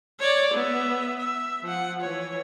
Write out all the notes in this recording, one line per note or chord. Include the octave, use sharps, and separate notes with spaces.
C#5 D5
B3 E5
E5
F3 F#5
E3 C#5